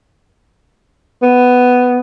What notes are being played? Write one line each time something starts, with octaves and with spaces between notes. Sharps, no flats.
B3